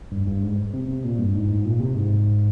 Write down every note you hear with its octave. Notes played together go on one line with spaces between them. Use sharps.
G2
G2
G#2
C3
C3
A#2
G2
G#2
G#2
A#2
C3
G#2